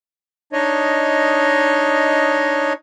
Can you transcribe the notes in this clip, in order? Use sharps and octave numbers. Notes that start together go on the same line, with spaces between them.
D4 D#4 C#5 D#5